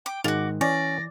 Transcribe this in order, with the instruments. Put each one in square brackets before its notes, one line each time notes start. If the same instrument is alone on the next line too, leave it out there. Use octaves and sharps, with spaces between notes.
[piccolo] G5 [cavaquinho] D6
[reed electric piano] G#2 D#3 G#3 [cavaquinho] F4 F#4 [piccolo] D6
[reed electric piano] E3 [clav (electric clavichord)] C#4 [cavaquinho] D5 [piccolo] A#6